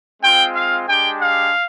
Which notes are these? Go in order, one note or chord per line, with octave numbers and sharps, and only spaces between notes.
G#3 C4 F4 G5
F5
G#3 D4 G4 G5
F5